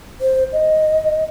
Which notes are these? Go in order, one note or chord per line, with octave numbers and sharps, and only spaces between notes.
C5
D#5